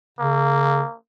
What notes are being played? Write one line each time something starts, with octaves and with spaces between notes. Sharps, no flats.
C#3 A#3